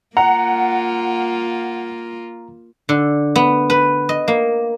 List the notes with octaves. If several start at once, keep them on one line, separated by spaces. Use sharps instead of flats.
A#3 F4 F#5 A#5
D3
B3
B4
D#5
A#3